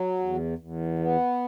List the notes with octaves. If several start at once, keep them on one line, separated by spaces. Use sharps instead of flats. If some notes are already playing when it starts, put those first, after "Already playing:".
Already playing: F#3
E2
E2
B3